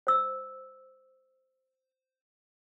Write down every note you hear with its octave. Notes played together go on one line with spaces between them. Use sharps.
C5 E6